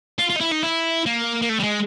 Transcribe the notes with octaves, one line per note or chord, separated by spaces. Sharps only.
F4
F4
D#4
E4
D#4
E4
A#3
A#3
A3
G3
G#3